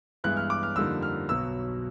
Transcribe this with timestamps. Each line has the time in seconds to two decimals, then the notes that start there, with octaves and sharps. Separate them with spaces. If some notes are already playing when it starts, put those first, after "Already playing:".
0.24 G2 E3 G#3 B3 E4 F#6
0.37 F6
0.50 D6
0.63 F6
0.76 F2 D3 G3 A#3 D#4 E6
1.02 F6
1.29 B1 B2 F#3 B3 E6